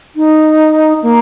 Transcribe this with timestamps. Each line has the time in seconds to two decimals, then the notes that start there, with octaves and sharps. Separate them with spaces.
0.16 D#4
1.02 A#3